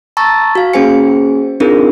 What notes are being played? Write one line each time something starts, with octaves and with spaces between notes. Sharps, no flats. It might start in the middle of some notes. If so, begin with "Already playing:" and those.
A5 A#5 C#6 E6 A6
F#4 F5
A#3 C#4 G#4 C5 G#5 C#7
C4 D4 D#4 F4 G#4 A#4